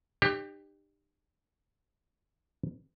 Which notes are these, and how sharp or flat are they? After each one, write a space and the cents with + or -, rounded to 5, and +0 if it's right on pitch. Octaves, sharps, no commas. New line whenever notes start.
D#4 -45 G4 +15 C5 +30